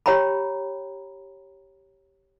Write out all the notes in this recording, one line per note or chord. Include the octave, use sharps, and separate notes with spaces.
G4 C#5 G5 A#5 B5